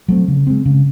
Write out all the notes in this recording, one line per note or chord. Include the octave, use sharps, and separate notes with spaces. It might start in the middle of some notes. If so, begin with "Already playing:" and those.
F#3 A3 C4
C#3
G#3 C4
C#3